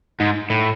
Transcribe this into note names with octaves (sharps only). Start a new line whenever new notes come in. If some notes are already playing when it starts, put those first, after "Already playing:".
G#2
A2